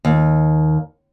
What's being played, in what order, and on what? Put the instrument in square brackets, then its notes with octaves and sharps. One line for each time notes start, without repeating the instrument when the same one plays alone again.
[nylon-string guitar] D#2